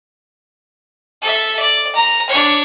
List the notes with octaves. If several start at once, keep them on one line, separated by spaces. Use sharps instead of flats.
A4 E5
D5
A#5
D4 C#5